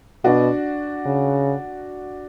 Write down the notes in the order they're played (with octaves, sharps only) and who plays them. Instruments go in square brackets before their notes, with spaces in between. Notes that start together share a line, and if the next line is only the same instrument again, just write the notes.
[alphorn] B2 [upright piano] D4 F#4
[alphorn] C#3